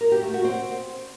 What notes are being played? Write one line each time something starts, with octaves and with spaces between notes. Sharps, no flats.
A#4
G4
A3
F#4
C4